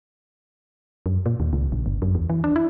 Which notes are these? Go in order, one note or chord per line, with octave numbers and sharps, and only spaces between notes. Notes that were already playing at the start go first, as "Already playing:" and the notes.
F#2
A#2
D#2
C#2
A#1
G1
F#2
E2
E3
D4
E4